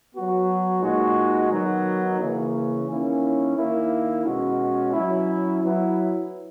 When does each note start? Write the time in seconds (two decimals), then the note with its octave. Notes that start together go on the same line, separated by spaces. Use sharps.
0.14 F#3 B3 F#4
0.82 A#2 G#3 D#4 F#4
1.50 D#3 F#3 B3 D#4
2.20 C#3 E3 A#3 C#4
2.87 D#3 A#3 C#4 E4
3.56 D#3 A#3 E4
4.24 B2 G#3 C#4 F#4
4.93 F#3 C#4 E4
5.62 F#3 B3 E4